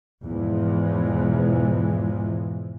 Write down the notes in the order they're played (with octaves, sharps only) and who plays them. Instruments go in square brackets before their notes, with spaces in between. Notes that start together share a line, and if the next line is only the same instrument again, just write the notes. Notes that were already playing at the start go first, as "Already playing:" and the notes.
[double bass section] E2 G#2 B2 E3 F3 G#3